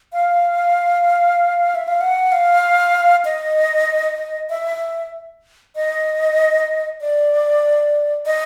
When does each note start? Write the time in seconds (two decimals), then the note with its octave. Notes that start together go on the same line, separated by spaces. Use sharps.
0.13 F5
1.75 E5
1.88 F5
2.01 F#5
2.32 F5
3.25 D#5
4.50 E5
5.76 D#5
7.01 D5
8.26 D#5